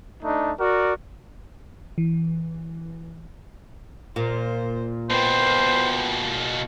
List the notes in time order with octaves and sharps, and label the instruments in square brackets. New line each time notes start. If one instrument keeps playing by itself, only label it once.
[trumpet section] A3 D4 D#4
F#4 A#4 D5
[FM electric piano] E3
[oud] A#2 [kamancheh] C5
[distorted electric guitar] B2 A#3 [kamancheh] B4 G5 [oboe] C5